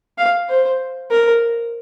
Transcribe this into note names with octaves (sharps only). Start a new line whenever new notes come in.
F5
C5
A#4